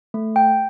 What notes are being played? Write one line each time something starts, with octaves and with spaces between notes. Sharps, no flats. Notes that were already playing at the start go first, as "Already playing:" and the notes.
A3
G5